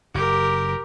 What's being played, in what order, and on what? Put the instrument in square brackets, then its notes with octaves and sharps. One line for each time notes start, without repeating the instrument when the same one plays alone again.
[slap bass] F#1 [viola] G4 A#4